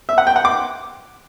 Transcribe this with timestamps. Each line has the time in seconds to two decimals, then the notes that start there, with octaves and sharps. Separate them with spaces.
0.09 E5
0.18 F#5
0.27 G5
0.36 F#5
0.45 D6